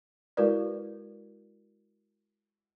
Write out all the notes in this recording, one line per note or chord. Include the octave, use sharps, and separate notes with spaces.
G#3 E4 F#4 A#4 B4 D5